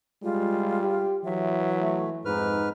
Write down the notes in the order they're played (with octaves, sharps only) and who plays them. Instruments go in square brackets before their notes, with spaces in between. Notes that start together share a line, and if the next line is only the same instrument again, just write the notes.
[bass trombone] G3 [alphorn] G#3 [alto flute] F4
[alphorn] G4
[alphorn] E3 [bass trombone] F#3 [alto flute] E5
[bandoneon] A3
[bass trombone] F2 [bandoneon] G#2 B4 F6 [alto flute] D#4